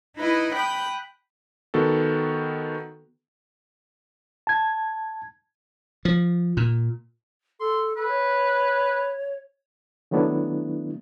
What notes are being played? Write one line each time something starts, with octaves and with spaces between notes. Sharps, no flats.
D#4 E4 B4 D#5
G5 B5 D#6 F#6 G6
D#3 B3 F#4 A4
A5 G#6
F3
A#2
A4 C6
A4 B4
C#5
D#3 F#3 A3 B3 D4 E4